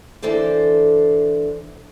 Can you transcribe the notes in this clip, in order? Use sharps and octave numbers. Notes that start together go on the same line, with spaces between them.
D3 E3 A4 C5 D5